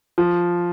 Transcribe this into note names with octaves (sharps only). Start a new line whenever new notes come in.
F3